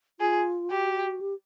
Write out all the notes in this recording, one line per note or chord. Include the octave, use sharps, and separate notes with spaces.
F4 G#4
F#4 G4
G4